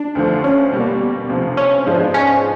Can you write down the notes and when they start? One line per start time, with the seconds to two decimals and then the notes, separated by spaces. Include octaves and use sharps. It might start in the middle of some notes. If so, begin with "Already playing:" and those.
Already playing: D4
0.15 D2 D3 F3 A3
0.44 C#4
0.72 B2 G3 A#3
1.29 D2 C3 F3
1.57 C#4
1.86 G#2 F3 G#3 B3 D4
2.14 C#4